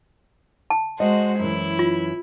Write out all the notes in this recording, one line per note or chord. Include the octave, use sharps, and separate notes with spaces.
A5
G#3 F#4 C5 D#5
F#2 E3 E4
F4